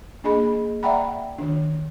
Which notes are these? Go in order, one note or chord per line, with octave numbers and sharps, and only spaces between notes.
A#3 D4 G#4 D#5 B5
D5 E5 F#5 G5 A#5 B5
D#3 D4